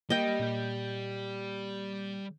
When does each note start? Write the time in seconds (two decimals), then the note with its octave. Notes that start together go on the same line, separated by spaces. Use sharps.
0.10 G3 A#3 G4 D#5 G5
0.40 A#2 A#3 G6